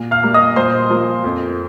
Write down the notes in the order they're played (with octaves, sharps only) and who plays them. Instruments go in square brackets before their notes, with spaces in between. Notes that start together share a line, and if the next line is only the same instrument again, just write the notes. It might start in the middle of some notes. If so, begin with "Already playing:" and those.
Already playing: [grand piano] A#2
F5 F6
G3 A#3
D#5 D#6
A#2 C5 C6
F3 A#3
F2